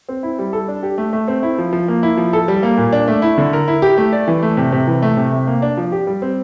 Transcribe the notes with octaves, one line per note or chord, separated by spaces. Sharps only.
C4
E4
G3
A4
D4
G4
A3
A3
C4
E4
F3
F3
A#3
E4
F3
A4
G3
A#3
A#2
D4
A3
E4
D3
A#4
E4
G4
A3
D5
E3
A3
C3
C3
E3
A3
C3
C3
A#3
D4
F3
G4
G3
C4